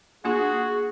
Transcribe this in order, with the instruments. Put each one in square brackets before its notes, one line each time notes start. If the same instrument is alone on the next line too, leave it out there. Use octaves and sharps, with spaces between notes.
[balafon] A#3 D4 F4 [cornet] F#4 [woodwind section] G#4